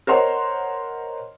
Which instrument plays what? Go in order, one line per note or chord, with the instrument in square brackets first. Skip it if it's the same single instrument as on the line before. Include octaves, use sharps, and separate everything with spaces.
[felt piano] A#4 C5 C#5 D#5 F#5 C6